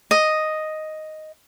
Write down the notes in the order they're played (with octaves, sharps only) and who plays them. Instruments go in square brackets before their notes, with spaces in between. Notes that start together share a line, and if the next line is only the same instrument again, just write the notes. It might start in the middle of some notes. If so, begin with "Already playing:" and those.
[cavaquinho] D#5